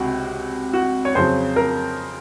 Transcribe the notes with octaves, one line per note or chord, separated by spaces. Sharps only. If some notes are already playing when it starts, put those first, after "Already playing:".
Already playing: C#2 C3 F#4
F#4
C#5
F2 C#3 F#3 C5
A#4